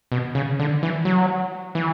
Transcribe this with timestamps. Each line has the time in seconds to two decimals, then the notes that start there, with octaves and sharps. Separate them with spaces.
0.12 B2
0.35 C#3
0.59 D3
0.83 E3
1.05 F#3
1.75 E3